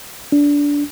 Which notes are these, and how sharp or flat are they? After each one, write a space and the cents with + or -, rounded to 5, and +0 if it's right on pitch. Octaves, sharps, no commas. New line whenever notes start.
D4 -20